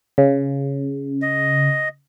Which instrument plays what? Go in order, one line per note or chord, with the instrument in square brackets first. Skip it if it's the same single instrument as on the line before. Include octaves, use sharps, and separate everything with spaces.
[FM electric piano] C#3
[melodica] D#5